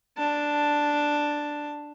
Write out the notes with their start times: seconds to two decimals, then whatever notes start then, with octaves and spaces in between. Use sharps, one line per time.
0.18 D4 A5